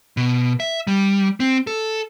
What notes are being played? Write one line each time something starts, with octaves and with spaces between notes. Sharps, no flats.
B2
E5
G3
C4
A4